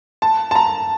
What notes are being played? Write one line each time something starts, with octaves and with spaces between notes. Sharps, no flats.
A5
A5
A#5